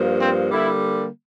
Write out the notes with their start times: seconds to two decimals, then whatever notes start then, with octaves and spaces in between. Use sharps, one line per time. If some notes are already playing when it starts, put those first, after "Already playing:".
Already playing: G2 F3 A#3
0.21 C4
0.51 D3 G3 A#3 E4